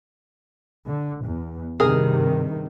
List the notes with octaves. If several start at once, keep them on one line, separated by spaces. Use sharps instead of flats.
D3
E2
G2 C3 D#3 G#4 A#4